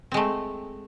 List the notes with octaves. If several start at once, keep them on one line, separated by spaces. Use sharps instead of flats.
G#3 A3 C4